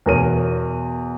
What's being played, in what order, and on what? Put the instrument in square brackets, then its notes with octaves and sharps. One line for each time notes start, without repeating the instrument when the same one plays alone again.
[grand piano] E2 B2 A#4 C#5 D#7